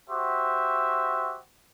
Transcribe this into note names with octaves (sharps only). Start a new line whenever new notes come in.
F#4 G4 C5 E5